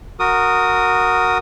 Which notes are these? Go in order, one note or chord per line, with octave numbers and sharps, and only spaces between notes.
F#4 A#4 D#6